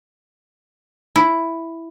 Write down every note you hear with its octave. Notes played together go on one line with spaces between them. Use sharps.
E4